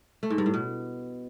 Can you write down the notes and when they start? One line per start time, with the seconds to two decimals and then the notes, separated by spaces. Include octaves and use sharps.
0.23 A3
0.30 G#2
0.38 G2
0.46 A2
0.54 B2